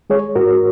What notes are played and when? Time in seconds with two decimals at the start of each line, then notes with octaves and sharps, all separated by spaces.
0.10 G#3 G#4 C#5
0.35 G#2 F#4 A#4